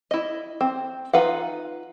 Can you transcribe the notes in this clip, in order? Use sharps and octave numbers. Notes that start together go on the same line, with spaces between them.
E4 D#5
C4
D#4 F4 B4 F5 F#5